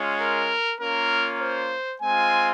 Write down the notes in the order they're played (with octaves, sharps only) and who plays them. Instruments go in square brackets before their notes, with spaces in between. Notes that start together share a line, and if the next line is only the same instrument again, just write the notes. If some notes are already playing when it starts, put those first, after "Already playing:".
Already playing: [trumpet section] G#3 C#4 F4
A#4
A#3 C#4 F4 A#4
C5
G#3 C4 F4 G#5